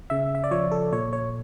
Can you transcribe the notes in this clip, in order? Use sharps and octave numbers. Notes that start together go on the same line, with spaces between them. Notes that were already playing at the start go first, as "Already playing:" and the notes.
C#3 E5
E5
D5
F3 C#5
A4
A#2 C#5
C#5